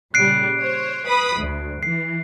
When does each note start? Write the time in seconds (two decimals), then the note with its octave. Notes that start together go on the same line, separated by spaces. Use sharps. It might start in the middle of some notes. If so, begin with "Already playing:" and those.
0.14 A#2 C#3 G3 F#6 C7 D7
0.61 C5 C#5
1.07 B4 B5 D#6
1.38 D2
1.83 E3 C7